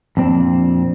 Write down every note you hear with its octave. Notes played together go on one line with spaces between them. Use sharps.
F2 A#2 C4 D4